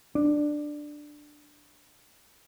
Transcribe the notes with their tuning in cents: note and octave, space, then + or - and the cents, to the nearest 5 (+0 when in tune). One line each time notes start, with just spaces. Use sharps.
D4 +10